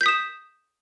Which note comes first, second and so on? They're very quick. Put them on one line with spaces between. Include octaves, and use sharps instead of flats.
G6 B6 D#6 E7